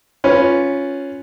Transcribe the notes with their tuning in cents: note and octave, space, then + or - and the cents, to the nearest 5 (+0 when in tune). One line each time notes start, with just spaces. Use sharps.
C#4 +0 F4 +0 B4 +0